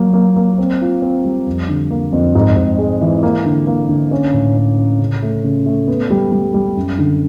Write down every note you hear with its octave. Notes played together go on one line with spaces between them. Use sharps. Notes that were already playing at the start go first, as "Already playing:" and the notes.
Already playing: F#3 A#3
A#3
A#3
C4
F4
C4
G3
F2
D3
A#3
F2
G#2
G#2
G#3
E3
A#3
D3
A#3
D3
C#4
A2
C#4
C#4
C#3
A3
C#3
A3
B3
G3
G3
G3
F#2
D3